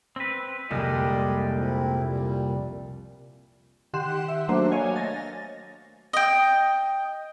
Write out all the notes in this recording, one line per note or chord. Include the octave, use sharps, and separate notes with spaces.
C4 B4
C2 F2 A#2 G3 G#3 G4 D5 D#5
C4 E4
A#2 G3
D#3 G4 F#5 C6 F#6 E7
E5
F#3 A3 A#3 D4 F#4 C5
C#5 D#5 F5 G#5
A6 A#6
D#5 G5